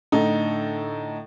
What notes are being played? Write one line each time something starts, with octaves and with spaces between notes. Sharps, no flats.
A2 D3 D#4 A4